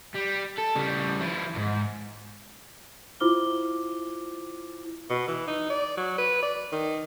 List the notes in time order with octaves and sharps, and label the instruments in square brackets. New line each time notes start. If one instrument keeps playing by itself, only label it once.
[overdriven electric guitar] G3
A4
C#3 G3
F3 E4
E2 G#2
[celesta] E4 F4 C5 D6 F6 G7
[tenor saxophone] B2
E3
D#4
D5
F#3
B4
D5
D#3